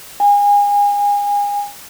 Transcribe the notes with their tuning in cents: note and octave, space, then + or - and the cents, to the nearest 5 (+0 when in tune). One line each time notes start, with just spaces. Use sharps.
G#5 -30